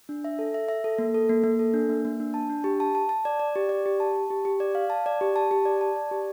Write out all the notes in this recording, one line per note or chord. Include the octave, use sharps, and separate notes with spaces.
D4
E5
A4
E5
E5
A4
A#3
A4
A#3
A#3
A4
D4
A#3
A#3
D4
A5
D4
G4
A5
A5
A5
D5
D5
G4
D5
G4
A5
A5
G4
G4
D5
F5
A5
D5
G4
A5
G4
D5
A5
D5
G4